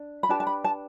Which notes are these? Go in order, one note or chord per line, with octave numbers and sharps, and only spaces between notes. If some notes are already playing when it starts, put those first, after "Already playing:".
Already playing: D4
B5
D4 G4 B4 A5
A5
B5
A5